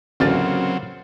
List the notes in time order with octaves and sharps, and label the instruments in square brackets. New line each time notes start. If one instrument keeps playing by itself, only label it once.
[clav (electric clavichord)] A1 D2 F4 [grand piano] C#3 A#3 A6 [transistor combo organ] F#3 C4